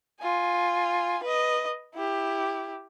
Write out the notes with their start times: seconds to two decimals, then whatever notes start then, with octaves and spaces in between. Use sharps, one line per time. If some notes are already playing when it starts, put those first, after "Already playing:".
0.21 F4 G#5
1.23 B4 D#5
1.94 E4 G4